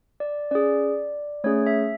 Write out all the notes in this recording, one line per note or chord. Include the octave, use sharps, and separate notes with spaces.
D5
C#4 G#4 D5
A3 C#4 G#4 C#5
E5